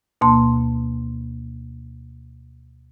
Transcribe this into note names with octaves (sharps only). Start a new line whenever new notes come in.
D2 B2 A#3 A5 C6